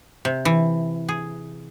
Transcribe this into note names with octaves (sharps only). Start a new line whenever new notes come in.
C3
E3
G#4